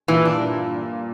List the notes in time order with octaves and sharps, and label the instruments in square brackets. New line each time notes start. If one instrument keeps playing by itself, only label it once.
[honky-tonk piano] G2 A#2 [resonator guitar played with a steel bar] E3
[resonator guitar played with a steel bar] D4